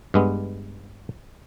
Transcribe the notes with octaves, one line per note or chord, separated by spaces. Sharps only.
G2 G#3 B3